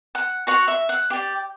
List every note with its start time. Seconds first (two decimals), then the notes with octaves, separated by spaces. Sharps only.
0.15 F#5
0.47 F#4 C#5 F#5
0.68 E5
0.89 F#5
1.10 G4 D5 G5